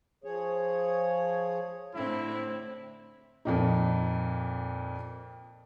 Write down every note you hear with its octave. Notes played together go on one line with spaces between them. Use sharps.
F3 G#4 C#5
A2 D3 C4 E4
F2 A#2 D#4